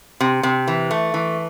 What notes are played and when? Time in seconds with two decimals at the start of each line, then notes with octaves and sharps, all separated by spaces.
0.21 C3
0.43 C3
0.68 E3
0.91 A3
1.14 E3